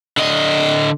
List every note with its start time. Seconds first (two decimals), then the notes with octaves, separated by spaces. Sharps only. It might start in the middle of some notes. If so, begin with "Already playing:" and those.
0.17 D3 D#5